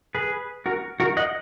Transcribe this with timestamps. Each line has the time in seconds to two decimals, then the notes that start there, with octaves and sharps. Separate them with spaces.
0.15 G#4 B4
0.66 F#4 A#4
1.00 F#4 A#4
1.17 D#5 F#5